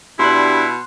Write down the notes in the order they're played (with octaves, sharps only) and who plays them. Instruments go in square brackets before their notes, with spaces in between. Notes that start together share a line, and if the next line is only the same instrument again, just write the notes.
[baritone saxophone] B2 [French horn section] D4 G4 [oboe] E4 [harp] C6 F#6